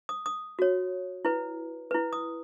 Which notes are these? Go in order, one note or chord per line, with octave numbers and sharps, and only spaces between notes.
D#6
D#6
F#4 C#5
E4 B4
E4 B4
D#6